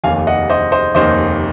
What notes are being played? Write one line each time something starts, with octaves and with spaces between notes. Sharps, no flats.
F1 D#2 D#3 F5 G#5
D#5 F#5
C5 D#5
C5 D#5
F1 D#2 D#3 C5 D#5